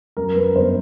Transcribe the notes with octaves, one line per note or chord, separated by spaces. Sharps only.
F#2 A#4
F#2 B4
G1 C5